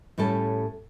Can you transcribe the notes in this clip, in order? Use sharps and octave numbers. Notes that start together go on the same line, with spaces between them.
A2 G3 C#4 A4